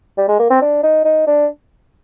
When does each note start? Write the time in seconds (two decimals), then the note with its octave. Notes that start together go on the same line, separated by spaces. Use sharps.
0.18 G3
0.28 G#3
0.39 A#3
0.50 C4
0.62 D4
0.83 D#4
1.05 D#4
1.27 D4